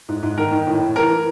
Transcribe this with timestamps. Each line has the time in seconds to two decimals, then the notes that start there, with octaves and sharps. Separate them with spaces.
0.09 G#2
0.23 G#2
0.38 D#3 A#4
0.51 D#3
0.67 A2
0.82 A2
0.96 E3 A#4
1.10 E3